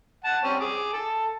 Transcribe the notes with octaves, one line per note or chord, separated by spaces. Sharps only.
F#5 A5
G3 C4 C#4
G#4 D6
A4